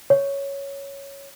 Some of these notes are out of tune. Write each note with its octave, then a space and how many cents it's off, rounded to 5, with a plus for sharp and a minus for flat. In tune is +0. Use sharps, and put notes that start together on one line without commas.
C#5 +5